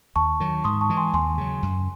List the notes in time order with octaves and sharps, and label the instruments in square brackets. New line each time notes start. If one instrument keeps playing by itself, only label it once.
[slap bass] D#2 [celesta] A5 C#6
[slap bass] D#3 F#3
[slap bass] G#2 [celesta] C6 D#6
[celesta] A5 C#6
[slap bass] E3 G#3
[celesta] G#5 C6
[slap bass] D#2 [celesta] G#5 C6
[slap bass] C#3 F#3
F#2